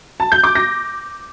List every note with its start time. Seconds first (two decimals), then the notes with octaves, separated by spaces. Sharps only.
0.20 A5
0.32 G6
0.44 D6
0.55 A#6